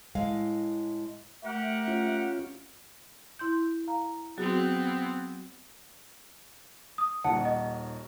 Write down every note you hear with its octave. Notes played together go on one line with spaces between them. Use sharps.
A2 G#3 F5
A3 G4 A#4 F#5
C#4 F4
E4 C6 G6
F5 A#5
F#3 B3 C4 F#4 G#4
D#6
D#1 D#2 F#5 A5
D#5